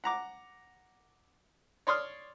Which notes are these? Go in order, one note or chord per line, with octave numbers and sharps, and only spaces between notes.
F#5 A#5 D6
C#5 D5 C6 D#6 F6